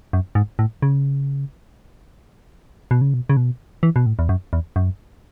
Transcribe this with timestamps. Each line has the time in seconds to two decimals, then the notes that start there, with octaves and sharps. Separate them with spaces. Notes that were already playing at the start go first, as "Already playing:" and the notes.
0.13 F#2
0.35 G#2
0.59 A2
0.82 C#3
2.91 B2
3.01 C#3
3.14 B2
3.30 C#3
3.37 B2
3.83 E3
3.96 B2
4.06 A2
4.19 E2
4.29 F#2
4.53 E2
4.76 F#2